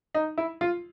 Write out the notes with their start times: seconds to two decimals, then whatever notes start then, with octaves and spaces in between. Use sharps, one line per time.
0.14 D#4
0.38 E4
0.61 F4